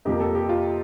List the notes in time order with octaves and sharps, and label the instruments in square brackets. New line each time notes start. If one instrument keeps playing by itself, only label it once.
[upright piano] F2 C3 F3 A#3 G4
A4
G4
F4